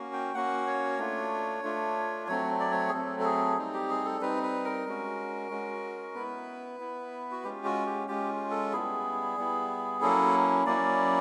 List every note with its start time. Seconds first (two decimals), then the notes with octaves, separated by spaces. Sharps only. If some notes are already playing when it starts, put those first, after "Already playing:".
Already playing: A#3 C#4 F#4
0.13 G5
0.34 A#3 C#4 F#4 F#5
0.67 C#5
0.99 A3 D4 F4
1.63 A3 D4 F4
2.28 F#3 A3 C4 C#5
2.60 D5
2.71 C#5
2.89 G#4
2.92 F#3 A3 C4 A4
3.20 A4
3.24 G#4
3.57 G3 C4 D#4
3.74 G4
3.90 G#4
4.05 A4
4.21 G3 C4 D#4 B4
4.43 B4
4.65 A#4
4.86 G#3 C#4 F#4
5.50 G#3 C#4 F#4
6.15 B3 E4 B4
6.80 B3 E4
7.31 F#4
7.44 G#3 C#4 F4 G4
7.65 F#4
7.86 G4
8.08 G#3 C#4 F4 G4
8.51 A4
8.73 G3 B3 E4 G#4
9.37 G3 B3 E4
10.01 F#3 A#3 C#4 E4 A4
10.66 F#3 A#3 C#4 E4 D5